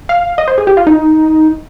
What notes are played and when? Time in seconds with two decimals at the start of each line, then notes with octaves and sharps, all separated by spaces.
0.09 F5
0.38 D#5
0.48 C5
0.58 G#4
0.67 G4
0.77 F4
0.87 D#4